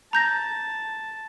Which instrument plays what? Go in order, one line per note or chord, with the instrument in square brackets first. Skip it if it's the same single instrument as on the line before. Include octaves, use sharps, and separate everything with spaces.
[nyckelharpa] A5 [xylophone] A#5 G6 A#6